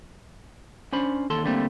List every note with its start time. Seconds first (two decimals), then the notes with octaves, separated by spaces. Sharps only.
0.93 C#4 D4 C5 B5
1.30 D#2 A4 A5 C6
1.45 D3 G3 A3 A#3 C4